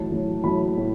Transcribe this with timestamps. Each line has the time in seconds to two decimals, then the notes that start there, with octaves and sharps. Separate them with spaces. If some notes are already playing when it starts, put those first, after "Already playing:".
Already playing: A1 A2 F#3 A5
0.11 A1 A2 F#3
0.43 A1 A2 F#3 B5
0.77 A2 F#3